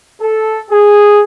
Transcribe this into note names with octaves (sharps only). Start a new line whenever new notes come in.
A4
G#4